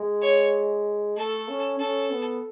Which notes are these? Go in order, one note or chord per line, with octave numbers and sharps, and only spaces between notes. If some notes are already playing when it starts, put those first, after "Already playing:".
Already playing: G#3
C#5
A3 A4
C#4
C#4 A4
B3